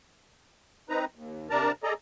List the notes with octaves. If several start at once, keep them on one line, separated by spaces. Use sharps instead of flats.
C4 D#4 B4 A#5
D#2
C3 D4 A#4 D5 A5 A#5
G#4 A4 D5 D#5 A#5